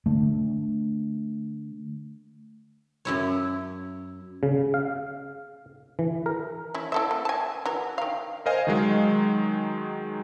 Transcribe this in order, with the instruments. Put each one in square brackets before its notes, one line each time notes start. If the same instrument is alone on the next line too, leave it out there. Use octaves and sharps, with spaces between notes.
[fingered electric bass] D3 A3
[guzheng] F#2 E4 C#5
[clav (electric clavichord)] C#3
F5
E3
A#4
[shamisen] C#4 E4
E4 A4 E5
A#3
G#5 A5
E3 F#4 A#4
D#3 F5
[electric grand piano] A#4 C5 D#5 F5 G#5
D#3 F#3 G#3